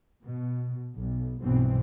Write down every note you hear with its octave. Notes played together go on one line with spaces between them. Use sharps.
B2
B1
B1 G2 B2 E3 C4